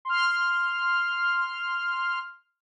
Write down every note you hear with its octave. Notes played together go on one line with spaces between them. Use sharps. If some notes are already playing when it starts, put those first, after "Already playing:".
C6 F6